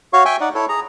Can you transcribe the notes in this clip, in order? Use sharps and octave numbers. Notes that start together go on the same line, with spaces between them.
F#4 C#5 F5 C#6
E5 G5 G#5 C#6
D#4 D5 F#5
E4 A4 C#5
G#4 A#5